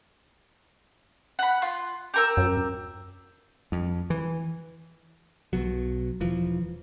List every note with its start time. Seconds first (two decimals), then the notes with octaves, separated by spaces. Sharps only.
1.39 F#5 B5
1.62 F4
2.14 G4 A#4 E6
2.37 F#2
3.72 F2
4.10 E3
5.53 B1 B2 F#3
6.20 E1 E3 F3